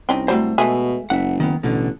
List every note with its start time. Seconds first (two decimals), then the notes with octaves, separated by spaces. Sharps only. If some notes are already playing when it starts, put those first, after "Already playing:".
0.09 C2 C4 C#4 D#4
0.28 F#3 G3 A3 C5
0.58 B2 G#3 A3 G#4 E5
1.10 F#1 E5 F#5
1.40 D#3 B3
1.63 A1 B2 D3